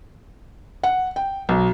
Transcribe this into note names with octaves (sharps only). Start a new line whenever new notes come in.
F#5
G5
B1